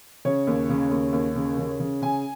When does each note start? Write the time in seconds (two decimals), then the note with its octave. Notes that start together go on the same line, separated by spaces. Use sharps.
0.25 C#3 C#5
0.47 D#2
0.69 C#3
0.91 D#2
1.13 D#2
1.35 C#3
1.58 C#3
1.80 C#3
2.02 C#3 G#5